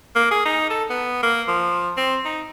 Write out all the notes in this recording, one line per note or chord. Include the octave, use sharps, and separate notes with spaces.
A#3
G#4
D#4
A4
B3
A#3
F3
C4
D#4